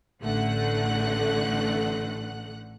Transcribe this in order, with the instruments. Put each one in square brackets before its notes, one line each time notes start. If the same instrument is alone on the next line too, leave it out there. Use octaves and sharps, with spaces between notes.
[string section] A1 D3 A3 F#5 F#6